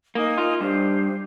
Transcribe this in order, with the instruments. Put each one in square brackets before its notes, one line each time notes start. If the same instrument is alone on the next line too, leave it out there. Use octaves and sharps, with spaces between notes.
[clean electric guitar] A#3 [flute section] D#4 G#5 D#6
[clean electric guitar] F4
[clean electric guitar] G2 [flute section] G4 C5